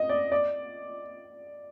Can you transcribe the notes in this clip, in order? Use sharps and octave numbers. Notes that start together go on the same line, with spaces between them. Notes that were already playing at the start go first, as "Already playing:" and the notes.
Already playing: D#5
D5
D5